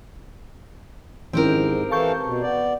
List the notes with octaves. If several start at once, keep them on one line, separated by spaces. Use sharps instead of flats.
G#2 D#3 C4 C#4 E4 G4 A#4
E3 A4 F5 A5 C#6 G6
B2
B3 D5